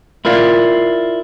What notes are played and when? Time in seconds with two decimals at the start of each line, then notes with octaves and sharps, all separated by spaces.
0.25 E4 F4 A#4 D5 F5